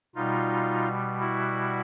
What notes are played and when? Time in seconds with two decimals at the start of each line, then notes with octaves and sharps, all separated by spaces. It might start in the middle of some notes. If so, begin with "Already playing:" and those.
0.16 B2 G3 D#4 F4
1.20 E4 F#4